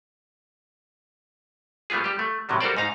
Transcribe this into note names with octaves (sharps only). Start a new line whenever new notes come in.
G3 A3 B3 F4 G#4
G3 G4
A3
A2 C3 F#3 G3
G3 F#4 A4 A#4 C5 D5
G#2 D#4 F5 A#5